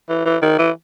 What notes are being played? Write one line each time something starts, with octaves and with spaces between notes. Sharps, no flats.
E3
E3
D#3
E3